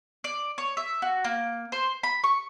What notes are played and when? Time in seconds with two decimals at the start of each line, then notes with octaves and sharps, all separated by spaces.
0.24 D5
0.58 C#5
0.77 E5
1.02 F#4
1.24 A#3
1.72 C5
2.03 B5
2.24 C#6